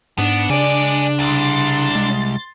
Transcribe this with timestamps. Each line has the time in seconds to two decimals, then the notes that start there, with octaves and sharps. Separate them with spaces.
0.18 G#2 B3 D4
0.50 C#3 G#3 D5 G#5
1.19 C2 C6 A6
1.95 G#3